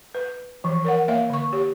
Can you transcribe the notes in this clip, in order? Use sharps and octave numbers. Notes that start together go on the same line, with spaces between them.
B4
E3 F3
A#4 C#5 F#5
A#3 C#5 E5 F5
D3 C#6
G4 C#5